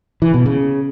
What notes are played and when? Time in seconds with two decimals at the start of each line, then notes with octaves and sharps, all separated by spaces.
0.22 E3
0.34 B2
0.46 C#3